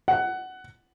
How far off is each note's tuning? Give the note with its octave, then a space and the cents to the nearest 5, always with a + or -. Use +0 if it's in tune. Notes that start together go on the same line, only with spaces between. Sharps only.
F#5 +15